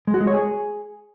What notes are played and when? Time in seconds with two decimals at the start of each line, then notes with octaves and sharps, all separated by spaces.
0.07 G#3
0.14 F#4
0.21 G#3
0.27 C#5
0.34 G#4